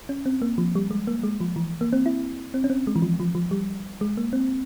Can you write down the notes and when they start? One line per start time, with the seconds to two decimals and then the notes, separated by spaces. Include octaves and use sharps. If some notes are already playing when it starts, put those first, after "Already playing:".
0.09 C#4
0.26 C4
0.42 A#3
0.58 F3
0.75 G3
0.91 G#3
1.07 A#3
1.23 G#3
1.40 F3
1.56 E3
1.81 A#3
1.93 C4
2.06 E4
2.54 C4
2.64 C#4
2.70 C4
2.87 G#3
2.96 E3
3.02 F3
3.20 F3
3.35 F3
3.51 G3
4.01 G#3
4.17 A#3
4.33 C4